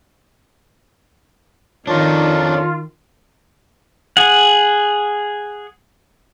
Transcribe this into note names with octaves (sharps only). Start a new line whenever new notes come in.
F2 D#3 D4 D#4 F4 C#5 D5
G#4 F#5